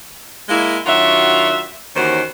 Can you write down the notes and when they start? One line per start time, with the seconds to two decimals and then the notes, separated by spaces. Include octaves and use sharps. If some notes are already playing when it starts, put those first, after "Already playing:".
0.49 G#3 A#3 E4
0.86 D#3 F#3 D4 F4 F#4 E5
1.95 D#2 D#3 E3 C#4 F#4 C5